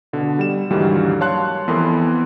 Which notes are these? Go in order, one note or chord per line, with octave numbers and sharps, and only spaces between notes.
B2 D3
G3 E7
D#2 G#2 D3 E3 F#3 G3
C#5 F5 A5 C6 F#6
F2 E3 B3 A4 A#4 C6